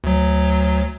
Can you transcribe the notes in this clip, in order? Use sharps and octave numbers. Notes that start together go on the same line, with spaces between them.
D2 F#3